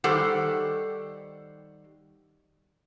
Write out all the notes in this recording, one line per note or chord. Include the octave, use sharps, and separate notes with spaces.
D#3 G3 G4 A4 C5 F#5